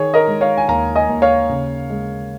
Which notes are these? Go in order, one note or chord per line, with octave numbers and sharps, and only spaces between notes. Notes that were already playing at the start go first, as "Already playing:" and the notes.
Already playing: D#3 G#4 C#5
A#4 D#5
G#3
C#5 F5
G#5
D#2 F5 A#5
D#5 G#5
D#2
C#5 F5
C#3
G#3